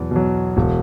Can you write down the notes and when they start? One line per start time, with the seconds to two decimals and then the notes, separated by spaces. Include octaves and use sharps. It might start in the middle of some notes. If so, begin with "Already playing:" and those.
Already playing: E2 B2 F#3
0.11 B2 F#3
0.57 E1